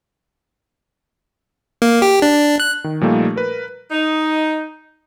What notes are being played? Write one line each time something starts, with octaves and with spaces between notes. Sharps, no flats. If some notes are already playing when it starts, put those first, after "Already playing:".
A#3
G4
D4
F#6
D#3
A#2 F3 G3 A3 A#3 D#4
A#4 B4
D#4